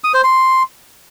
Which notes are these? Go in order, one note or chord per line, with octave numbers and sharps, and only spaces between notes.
D#6
C5
C6